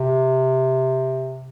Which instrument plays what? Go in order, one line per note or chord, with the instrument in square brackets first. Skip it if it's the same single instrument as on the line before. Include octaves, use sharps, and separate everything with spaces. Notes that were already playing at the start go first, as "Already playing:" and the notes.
Already playing: [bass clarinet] C3